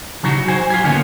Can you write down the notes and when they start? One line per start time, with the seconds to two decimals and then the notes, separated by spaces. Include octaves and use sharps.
0.23 C#3 F#3 D#4 F#4
0.48 F#3 C5 G#5
0.70 F4 G4 G#5
0.83 D3 D#3 A#3 B3 C#4